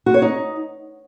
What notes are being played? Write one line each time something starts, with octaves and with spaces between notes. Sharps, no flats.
F#4
C#5
D#4